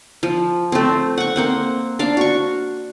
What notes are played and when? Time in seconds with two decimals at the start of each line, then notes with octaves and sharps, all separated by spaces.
0.23 F3
0.72 A3 C4
1.18 F#5 C#6
1.36 A#3 C4 F#5
1.99 D4 F5
2.17 F#4 C#6